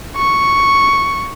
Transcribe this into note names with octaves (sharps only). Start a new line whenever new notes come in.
C#6